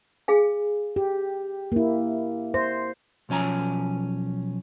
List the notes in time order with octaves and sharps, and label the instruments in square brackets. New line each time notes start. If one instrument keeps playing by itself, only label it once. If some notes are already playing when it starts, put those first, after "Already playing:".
[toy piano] G#4 F5 G#5
[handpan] G4
A#3 E4
[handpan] C5 [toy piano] E5
[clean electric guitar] B1 F3 C#4 G#5 A#5